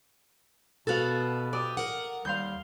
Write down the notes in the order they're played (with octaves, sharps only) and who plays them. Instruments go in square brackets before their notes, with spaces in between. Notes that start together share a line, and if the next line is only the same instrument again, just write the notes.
[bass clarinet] B2 [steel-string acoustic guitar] B3 F#4 A4 [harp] F5 F#6 A6
[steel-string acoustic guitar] G4 [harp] D5 D#6
[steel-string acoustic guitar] A#4 F#5
[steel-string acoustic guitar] D#2 [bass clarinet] G3 [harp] F5 C6 G6